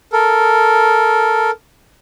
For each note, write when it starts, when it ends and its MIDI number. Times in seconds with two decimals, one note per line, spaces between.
0.12 1.51 69
0.12 1.51 70